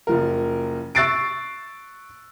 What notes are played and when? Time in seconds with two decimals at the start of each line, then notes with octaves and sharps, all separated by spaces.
0.07 F#1 F3 A#4
0.95 C#6 E6 F#6 A6 C7 D7